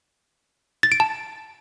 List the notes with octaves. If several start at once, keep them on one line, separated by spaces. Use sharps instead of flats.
A6
D7
A5